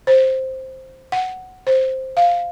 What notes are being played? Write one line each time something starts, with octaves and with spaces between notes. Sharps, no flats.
C5
F#5
C5
F5